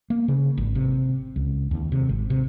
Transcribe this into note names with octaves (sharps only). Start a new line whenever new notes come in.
A#3
C#3
G#1
C3
C#2
D#2
C3
G#1
C3